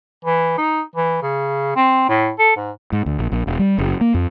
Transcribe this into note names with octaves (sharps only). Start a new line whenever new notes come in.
E3
D#4
E3
C#3
C4
A2
A4
G#2
G#2
D2
A#1
A#1
E1
G3
F#1
A#3
F2